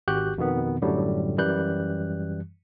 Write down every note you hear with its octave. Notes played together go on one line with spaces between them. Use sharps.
G#1 F#4 G4 F#6 G6
F2 B2 D#3 B3
F#2 A2 D3 F#3 G3
F#2 E3 G3 F#6 G6